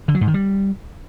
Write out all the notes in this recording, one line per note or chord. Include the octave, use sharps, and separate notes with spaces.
D3
F#3
G#2
D#3
G3